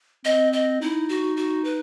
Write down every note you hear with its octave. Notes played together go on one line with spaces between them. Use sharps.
C4 D#5
D#5
D#4 E4
F#4
F#4
B4